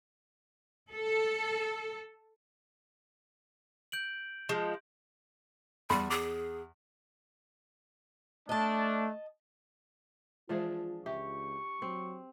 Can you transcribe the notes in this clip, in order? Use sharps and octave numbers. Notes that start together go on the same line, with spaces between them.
A4
G6 D7 F#7
F3 G#3
E2 G3 B5 C6
G#4 D6
A3 D4 D#5 A5
E3 F3 G#3 D4 F4 G#4 C5
C#2 G4 E5 C#6
F#3 C4